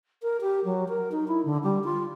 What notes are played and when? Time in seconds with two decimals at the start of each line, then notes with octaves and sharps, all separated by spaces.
0.22 A#4
0.41 G4
0.65 F#3
0.89 A#4
1.12 D#4
1.28 E4
1.45 D3
1.64 G3
1.84 F4